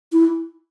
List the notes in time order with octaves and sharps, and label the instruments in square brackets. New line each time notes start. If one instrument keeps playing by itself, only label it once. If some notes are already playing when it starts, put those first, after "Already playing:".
[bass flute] E4